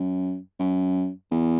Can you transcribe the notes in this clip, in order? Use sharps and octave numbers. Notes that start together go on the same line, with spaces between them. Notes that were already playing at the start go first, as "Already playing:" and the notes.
Already playing: F#2
F#2
E2